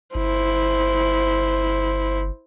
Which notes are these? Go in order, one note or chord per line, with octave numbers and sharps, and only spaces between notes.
G1 E4 C5